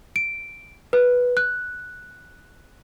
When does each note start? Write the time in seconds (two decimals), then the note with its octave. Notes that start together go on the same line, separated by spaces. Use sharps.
0.16 D7
0.93 B4
1.37 F#6